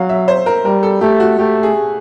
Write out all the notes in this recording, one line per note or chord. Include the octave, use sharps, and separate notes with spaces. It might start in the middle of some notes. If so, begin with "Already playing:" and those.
Already playing: F#3 F5
E5
C5
A#4
G3 A#4
A4
A3 G4
F#4
A3 G4
G#4